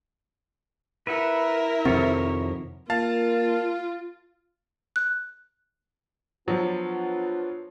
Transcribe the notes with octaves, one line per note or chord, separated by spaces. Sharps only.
E4 A#4 B4 E5 F#5
F2 C3 D#3 F3 C4 C#5
A#3 F4 F5 A5 A6
F#6
F3 F#3 B3 D4 F4